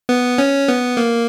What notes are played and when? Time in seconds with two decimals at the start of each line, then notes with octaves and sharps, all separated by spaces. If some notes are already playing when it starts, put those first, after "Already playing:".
0.09 B3
0.38 C#4
0.68 B3
0.97 A#3